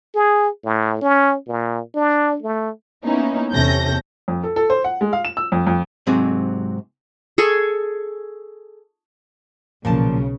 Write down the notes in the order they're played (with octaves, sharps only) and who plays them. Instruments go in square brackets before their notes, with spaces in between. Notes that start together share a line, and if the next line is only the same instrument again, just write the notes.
[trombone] G#4
A2
C#4
A#2
D4
A3
[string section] A#3 B3 C#4 D#4 E4
E2 C3 C#4 A4 G6 A#6
[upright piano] F2
A4
A4
C5
F#5
G#3
F5
E7
E6
F2
F2
[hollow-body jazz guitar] G#2 C3 F#3 C4 G#4
[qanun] G#4 A4 G#5 C#6
[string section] B1 C#3 [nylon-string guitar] A#2 F3 A5